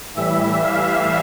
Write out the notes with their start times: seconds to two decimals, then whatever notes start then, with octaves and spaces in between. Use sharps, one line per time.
0.15 A2 E3 G3 E5
0.62 F5